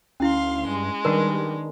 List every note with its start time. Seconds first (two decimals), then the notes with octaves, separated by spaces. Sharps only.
0.20 D2 C#4 E4 F5 C6
0.67 G2 G#3
1.05 D#3 G3 D4 A#4 B4